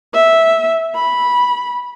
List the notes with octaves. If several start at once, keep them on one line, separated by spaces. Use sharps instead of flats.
E5
B5